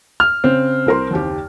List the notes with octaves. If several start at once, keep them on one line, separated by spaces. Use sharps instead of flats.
F6
C#3 C4
C2 A#4 C6
F#1 D#2 G4